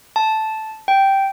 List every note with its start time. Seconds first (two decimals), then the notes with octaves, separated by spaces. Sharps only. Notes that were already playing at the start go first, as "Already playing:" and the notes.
0.16 A5
0.88 G5